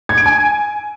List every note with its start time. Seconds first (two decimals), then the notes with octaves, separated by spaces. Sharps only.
0.09 G#6
0.18 D7
0.26 G#5